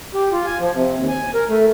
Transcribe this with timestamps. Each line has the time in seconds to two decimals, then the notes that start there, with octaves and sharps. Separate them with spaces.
0.14 G4
0.33 F4
0.46 G#5
0.60 F3
0.75 C3
0.97 D#2
1.09 G#5
1.34 A#4
1.50 A3